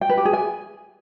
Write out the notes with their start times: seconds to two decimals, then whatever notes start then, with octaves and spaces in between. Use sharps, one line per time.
0.01 G5
0.09 B4
0.17 G4
0.25 G#4
0.33 G#5